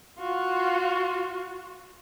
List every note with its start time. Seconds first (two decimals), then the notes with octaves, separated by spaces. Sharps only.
0.18 F4 F#4